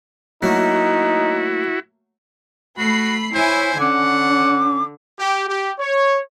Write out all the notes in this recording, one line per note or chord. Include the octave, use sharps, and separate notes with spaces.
F#3 A3 A#3 D#4 E4 F#4
A3 F#4 B5 C7
E4 C5 C#5 G#5
D3 C#4 F#5 D6
G4
G4
C#5